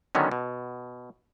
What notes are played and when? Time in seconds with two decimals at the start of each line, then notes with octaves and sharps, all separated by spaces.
0.15 D3 D#3 F#3 B3 C#4
0.31 B2